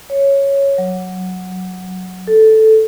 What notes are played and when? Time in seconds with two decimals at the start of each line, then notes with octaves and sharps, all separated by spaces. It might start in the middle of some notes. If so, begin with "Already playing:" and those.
0.10 C#5
0.78 F#3
2.27 A4